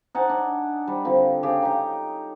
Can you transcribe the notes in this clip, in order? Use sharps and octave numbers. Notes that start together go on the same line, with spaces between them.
D#4 F#5 G#5 A5
D4
G3
D3 F3 C4
C#3 G4 G#4
D#4 G4